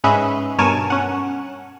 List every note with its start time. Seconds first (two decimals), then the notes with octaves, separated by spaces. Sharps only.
0.04 G#2 C#4 G#4 B4 D#5 E5
0.58 G2 B2 A#4 C#5 G#5 A5
0.90 C#4 F#5